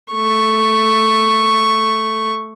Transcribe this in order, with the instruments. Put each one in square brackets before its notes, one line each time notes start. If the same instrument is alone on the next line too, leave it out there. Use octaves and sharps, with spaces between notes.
[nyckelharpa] A3 C#6